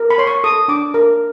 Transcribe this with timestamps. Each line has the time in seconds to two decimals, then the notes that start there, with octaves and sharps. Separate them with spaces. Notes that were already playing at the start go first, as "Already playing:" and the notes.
Already playing: A#4
0.10 B5
0.18 C#5 C6
0.27 C#6
0.44 A4 D#6
0.68 D4 D6
0.94 A#4